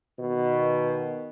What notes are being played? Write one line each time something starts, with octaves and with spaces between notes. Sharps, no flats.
B2 D#3